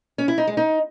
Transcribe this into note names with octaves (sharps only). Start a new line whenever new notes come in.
C#4
E4
D#4
G#3
D#4